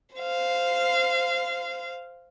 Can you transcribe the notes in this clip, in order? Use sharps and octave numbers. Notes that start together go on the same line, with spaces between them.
C5 F5